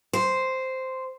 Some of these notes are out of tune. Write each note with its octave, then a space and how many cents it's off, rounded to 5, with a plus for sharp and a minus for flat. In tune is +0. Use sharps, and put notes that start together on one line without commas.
C5 -5